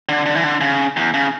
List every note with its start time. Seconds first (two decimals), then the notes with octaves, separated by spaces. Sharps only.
0.09 D3
0.26 D3
0.35 E3
0.44 D3
0.61 C#3
0.97 E2
1.14 C#3